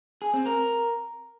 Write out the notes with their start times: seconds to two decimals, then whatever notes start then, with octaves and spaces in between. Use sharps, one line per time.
0.22 G#4
0.34 C4
0.46 A#4